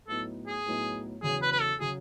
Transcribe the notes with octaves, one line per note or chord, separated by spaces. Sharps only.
A2 F#3 B3 D#4 A4
G#4
A2 F#3 B3 D#4
E2 C#3 F#3 G#4
B4
B4
A4
C#3 F#3 G#4